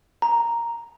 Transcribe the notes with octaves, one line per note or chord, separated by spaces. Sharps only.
A#5